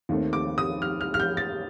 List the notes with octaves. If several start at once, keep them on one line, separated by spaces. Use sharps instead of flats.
D#2 D#3 A3 C4
D6
D#6
F6
F6
F6
G6
A6